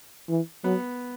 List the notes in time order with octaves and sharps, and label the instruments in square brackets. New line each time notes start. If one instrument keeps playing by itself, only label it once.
[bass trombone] E3
[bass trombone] F#3 [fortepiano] B3